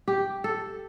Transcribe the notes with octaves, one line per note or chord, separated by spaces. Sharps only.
G4
A4